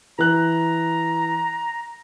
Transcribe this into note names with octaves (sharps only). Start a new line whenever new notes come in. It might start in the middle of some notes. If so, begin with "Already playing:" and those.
E3 A#5 F#6